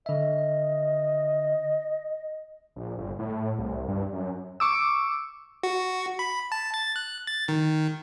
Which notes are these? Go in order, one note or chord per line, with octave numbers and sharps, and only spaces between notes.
D3 D#5 E5
A#1
G1
A2
C2
G2
F#2
C#6 D6 E6
F#4
B5
A5
A6
F#6
A6
D#3